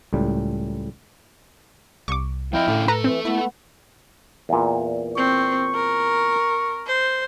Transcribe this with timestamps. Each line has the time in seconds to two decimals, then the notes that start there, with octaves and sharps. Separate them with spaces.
0.13 C#2 A2 G3
2.08 C2 C#6 D6
2.53 F3 C4 E4 D#5 F5 G5
2.68 A2 D3 C#4 A4
2.88 A3 A4 B4 A#5
3.04 E3 C4
3.25 B3 E4
4.49 E2 A#2
5.17 C4 C#6
5.74 A#4
6.87 C5